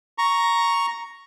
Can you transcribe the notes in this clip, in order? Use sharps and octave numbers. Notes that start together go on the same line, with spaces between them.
A#5 C#6